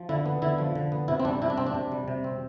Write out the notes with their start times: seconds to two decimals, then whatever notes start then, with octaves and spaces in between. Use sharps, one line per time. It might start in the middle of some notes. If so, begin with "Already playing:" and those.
Already playing: F3
0.09 D3 E4
0.26 B3
0.42 D3 E4
0.58 F3
0.75 D3
0.92 B3
1.08 C3 E4
1.20 C4
1.25 G3 D4
1.42 C3 E4
1.50 D4
1.57 C4
1.67 D4
1.75 C3
1.92 G3
2.08 C3
2.24 C4